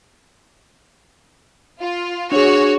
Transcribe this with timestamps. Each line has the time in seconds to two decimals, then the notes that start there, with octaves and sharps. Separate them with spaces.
1.80 F4
2.32 D4 F#4 G#4 C#5